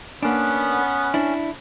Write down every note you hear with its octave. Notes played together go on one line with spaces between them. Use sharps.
A#3 B3 C#4 D4
D4 E4